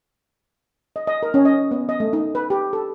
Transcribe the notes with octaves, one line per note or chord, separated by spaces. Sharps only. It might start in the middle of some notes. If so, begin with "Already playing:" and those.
D#5
D#5
A#4
C#4
D#5
B3
D#5
A3
D#4
B4
G4
A4